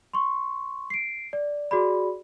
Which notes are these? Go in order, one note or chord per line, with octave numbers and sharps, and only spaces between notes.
C6 C#6
C7 D7
D5
F#4 G#4 D5 B5